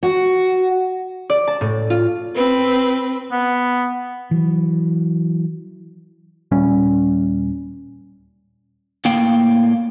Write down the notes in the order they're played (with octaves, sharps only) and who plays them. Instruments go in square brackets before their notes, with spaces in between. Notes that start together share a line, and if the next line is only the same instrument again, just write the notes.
[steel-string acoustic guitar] F#4
[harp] D5
A5
A2
F4
[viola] C4 B4
[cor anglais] B3
[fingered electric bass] E3 F#3
[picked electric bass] D#1 A#2 G3 C#4
[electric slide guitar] A2 A#3 F5 G5